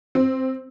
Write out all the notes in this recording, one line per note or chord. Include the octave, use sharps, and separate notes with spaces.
C4